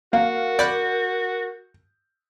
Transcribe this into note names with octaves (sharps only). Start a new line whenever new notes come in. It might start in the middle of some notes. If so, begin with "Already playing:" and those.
A#3 F#4 A#4 F5
D5 B5 F#6 G6